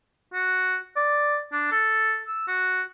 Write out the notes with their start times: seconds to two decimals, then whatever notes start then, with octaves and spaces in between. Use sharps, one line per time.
0.33 F#4
0.96 D5
1.52 D4
1.72 A4
2.28 E6
2.48 F#4